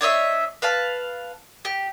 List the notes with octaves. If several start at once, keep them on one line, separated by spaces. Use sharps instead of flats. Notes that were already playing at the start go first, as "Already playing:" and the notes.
D4 C#5 D#5 E5
B4 F5 A5
G4